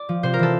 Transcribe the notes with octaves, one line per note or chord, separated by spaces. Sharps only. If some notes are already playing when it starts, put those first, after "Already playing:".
Already playing: D5
F3
C3 C5
A#4
E3 A4